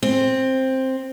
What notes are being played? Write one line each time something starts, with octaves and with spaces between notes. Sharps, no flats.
C4